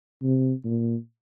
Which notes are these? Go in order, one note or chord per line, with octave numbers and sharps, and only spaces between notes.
C3
A#2